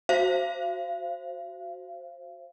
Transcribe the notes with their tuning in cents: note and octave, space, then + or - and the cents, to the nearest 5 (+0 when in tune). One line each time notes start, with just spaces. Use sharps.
F#4 +0 C5 +15 F5 -35